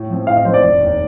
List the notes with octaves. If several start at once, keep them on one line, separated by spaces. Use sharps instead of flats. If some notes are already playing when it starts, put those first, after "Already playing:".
Already playing: A2
F3 C4
A2 F5
D#5
F3 C4 C5
D5
F1
D#2 D#3